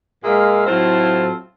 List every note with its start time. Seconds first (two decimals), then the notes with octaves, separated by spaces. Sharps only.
0.24 A#2 G#3 G#4 E5 F5
0.67 A2 F#3 C4 E4 F4 A4